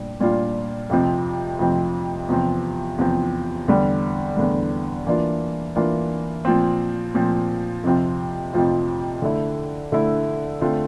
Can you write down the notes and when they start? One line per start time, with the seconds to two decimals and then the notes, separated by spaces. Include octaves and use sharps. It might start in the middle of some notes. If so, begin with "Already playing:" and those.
Already playing: A#2 G3 D4
0.20 A#2 G3 D4 F4
0.90 F2 C3 F3 C4
1.59 F2 C3 F3 C4
2.29 E2 C3 F3 C4
2.98 E2 C3 F3 C4
3.68 E2 D3 G3
4.37 E2 D3 G3
5.07 E3 A#3 D4 F4
5.76 E3 A#3 D4 F4
6.45 A#2 F3 C4
7.15 A#2 F3 C4
7.83 F2 C3 F3 C4 F4
8.53 F2 C3 F3 C4 F4
9.22 D3 A3 E4
9.92 D3 A3 E4
10.61 D3 A3 C4 F4